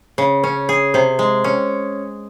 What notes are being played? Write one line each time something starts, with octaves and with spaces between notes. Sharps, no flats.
C#3
C#4
G#4
C3
G#3
C#4